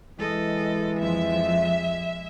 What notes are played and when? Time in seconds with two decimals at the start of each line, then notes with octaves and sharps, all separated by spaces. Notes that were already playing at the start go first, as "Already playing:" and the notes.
0.19 E3 G#3 A4 D#5
1.00 F2 F3 E5